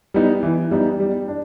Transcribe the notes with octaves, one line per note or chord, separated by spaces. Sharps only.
G3 B3 D#4
E3
G3 B3 D#4
G3
D4